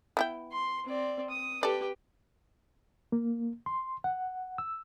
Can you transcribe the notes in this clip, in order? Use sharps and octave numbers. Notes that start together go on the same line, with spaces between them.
B3 E4 G5
C6
C4 D5
D#6
G4 A4 B4 D5
A#3
C6
F#5
E6